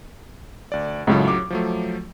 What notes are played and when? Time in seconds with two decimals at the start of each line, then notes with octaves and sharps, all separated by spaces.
0.72 D2 D5
1.07 C#2 F#2 A2 F#3
1.28 D6
1.50 F3 F#3 A3